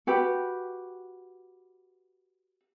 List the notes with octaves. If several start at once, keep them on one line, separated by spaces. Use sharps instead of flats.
F#4 G4 B4